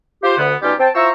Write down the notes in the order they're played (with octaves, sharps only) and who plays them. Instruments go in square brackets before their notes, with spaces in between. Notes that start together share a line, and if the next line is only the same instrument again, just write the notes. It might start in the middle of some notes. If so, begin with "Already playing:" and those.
[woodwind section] F4 G4 C5
D2 D3 B3
B2 G3 C#4 D#4 F4 G4
C4 G5 A5
E4 F4 C5 A#5 C#6 E6